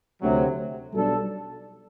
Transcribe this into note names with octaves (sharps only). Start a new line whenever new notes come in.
D2 C3 F#3
B1 B2 G3 D4 A4